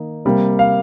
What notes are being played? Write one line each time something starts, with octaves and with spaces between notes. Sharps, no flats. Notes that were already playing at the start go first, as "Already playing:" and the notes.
Already playing: D#3 A#3 D#4
C3 G3 A#3
F5